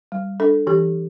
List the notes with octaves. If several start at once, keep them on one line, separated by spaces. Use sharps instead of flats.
G3
D4 A4
E3 G4